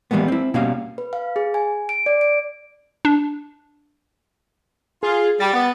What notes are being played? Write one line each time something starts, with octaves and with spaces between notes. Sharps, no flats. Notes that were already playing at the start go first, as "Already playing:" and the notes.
E3 G3 G#3 A#3 B3
C4 E4
B2 G3 A#3 C#4 F5
B4
F5
G#4
G#5
D7
D5
D7
D4
F4 G#4
G3 A6
B3